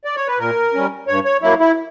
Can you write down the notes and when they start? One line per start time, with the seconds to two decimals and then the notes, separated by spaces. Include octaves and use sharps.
0.05 D5
0.16 C#5
0.27 B4
0.39 A#2 A#4
0.74 G3 C#4
1.07 G2 C#5
1.25 C#5
1.42 F#3 A#3 E4
1.60 E4